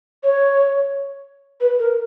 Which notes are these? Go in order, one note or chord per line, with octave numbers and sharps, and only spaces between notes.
C#5
B4
A#4